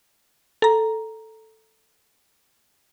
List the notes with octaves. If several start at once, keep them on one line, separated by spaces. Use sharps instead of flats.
A4 A#5